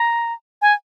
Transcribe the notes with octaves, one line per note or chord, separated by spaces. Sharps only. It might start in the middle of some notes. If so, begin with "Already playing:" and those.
Already playing: A#5
G#5